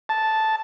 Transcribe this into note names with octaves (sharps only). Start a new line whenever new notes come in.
A5